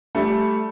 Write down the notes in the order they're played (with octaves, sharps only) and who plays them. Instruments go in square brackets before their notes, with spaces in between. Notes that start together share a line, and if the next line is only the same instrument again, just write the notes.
[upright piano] G3 A3